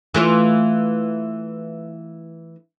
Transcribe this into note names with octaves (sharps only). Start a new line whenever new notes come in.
E3 A3 F4